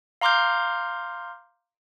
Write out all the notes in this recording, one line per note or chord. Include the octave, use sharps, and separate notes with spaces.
F5 A#5 C6 D6 F6 G6